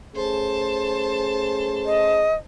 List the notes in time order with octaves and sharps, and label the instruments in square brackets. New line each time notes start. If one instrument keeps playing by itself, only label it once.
[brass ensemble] A3 C#4 G#4 [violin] C5 A5
[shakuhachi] D#5